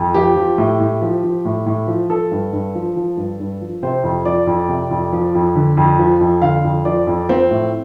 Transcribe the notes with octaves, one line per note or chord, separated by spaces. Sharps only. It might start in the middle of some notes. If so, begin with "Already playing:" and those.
Already playing: F2
F3 G4
F3
A2
A2
F3
F3
A2
A2
F3
F3 A4
G2
G2
F3
F3
G2
G2
F3
C3 C5
F2
F3 D5
F2
C3
F2
F3
F2
D3
F2
F3
F2
D3 F5
F2
F3 D5
F2
F3 C4
A2